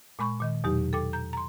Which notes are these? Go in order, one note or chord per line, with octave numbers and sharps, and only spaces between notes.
A#2 G#3 B5 C#6
A#2 D#3 D#5
E2 B2 F#3 D#4 G4
A4 G5 D6
A#5 G6
A#5 C6